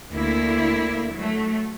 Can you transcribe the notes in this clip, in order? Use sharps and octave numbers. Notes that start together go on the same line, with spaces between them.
D2 A#3 E4
F#3 A3